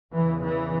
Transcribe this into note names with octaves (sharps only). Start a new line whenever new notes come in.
E2 C#3 E3
E3